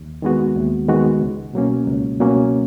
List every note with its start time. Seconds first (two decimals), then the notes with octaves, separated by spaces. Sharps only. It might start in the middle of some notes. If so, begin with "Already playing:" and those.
Already playing: D#2
0.22 D#3 G#3 B3 F#4
0.55 D#2
0.89 D#3 G#3 B3 F#4
1.21 C#2
1.53 B2 F#3 A#3 C#4
1.87 C#2
2.19 B2 F#3 A#3 C#4